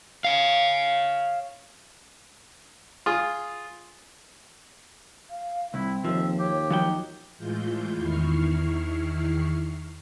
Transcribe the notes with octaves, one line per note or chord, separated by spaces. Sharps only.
C#5 F5
F4 G#4
F5
C2 C4 E4
D#2 F3 E5
G4 C#5
F3 F#3 D#4 G5
A2 E3 G#3 F4 G6
E2 D#3 E4 C#6 F6 C7